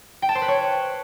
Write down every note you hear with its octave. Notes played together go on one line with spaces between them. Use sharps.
G5
A5
C5
B4
C#5